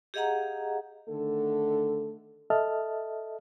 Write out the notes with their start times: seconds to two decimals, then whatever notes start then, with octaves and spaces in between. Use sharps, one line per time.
0.14 G4 G#4 D#5 F5 F#5 A#5
1.09 D3 D#3 A3 A4
2.50 A4 D#5 E5 A5 F6